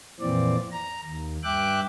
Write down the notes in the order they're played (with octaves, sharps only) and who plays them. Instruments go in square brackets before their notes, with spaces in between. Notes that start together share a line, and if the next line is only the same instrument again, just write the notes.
[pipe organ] F2 A#2 E3 C4 D5
A#5
D#2
G2 E5 G5 D6 F#6